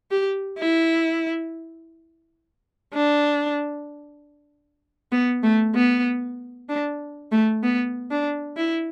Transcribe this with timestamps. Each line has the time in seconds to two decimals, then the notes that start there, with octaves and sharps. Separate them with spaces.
0.11 G4
0.58 E4
2.94 D4
5.12 B3
5.43 A3
5.75 B3
6.69 D4
7.32 A3
7.63 B3
8.11 D4
8.57 E4